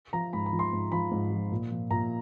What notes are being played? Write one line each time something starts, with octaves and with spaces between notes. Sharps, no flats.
F3 A#5
G#2 B5
B5
F3
C6
G#2
F3 B5
G#2
F3
A#2
F3
A#2 A#5